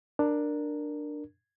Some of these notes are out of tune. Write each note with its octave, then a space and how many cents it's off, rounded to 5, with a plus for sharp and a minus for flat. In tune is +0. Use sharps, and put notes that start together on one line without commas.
D4 +10 A#4 +0